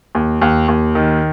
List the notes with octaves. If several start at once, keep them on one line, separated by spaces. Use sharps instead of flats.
D#2
D#2
D#2
D#3